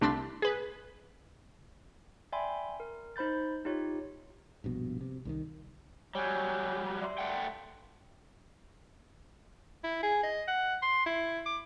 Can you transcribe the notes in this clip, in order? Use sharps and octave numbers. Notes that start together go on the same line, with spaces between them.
C2 A3 D4 B5 C6 A6
G#4 B4
D5 E5 G5 G#5 B5 C6
A#4
D#4 C5 B5 G6 A6
D#4 F4 G4 C#5
A#1 G2 B2
C3
C2 D3 D#3
F#3 G3 C#5 G#5 G6
D5 E5 C6
A3 F#5 G5
E4
G#4
D#5
F#5
C6
E4
D6